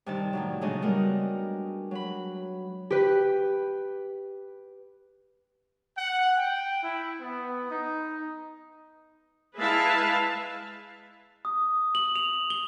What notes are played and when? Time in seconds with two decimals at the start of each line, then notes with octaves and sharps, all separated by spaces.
0.06 G2 C3 D#3 D#4 D5 A5
0.33 A2 D#3 F#3
0.61 A#2 C#3 G#3 D4 D#5
0.82 G3 G#3 B3 F#4 A#4
1.91 F#3 B5
2.91 G4 B4
5.98 F#5
6.37 G5
6.82 E4
7.21 B3
7.71 D#4
9.58 G#3 E4 B4 E5 F5 A5
11.45 D#6
11.95 F#7
12.16 F7
12.50 G7